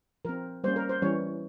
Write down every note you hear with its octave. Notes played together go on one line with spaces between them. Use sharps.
F3 C4 A#4
G3 A#3 C#4 C5
A#4
C5
E3 G3 C#4 C#5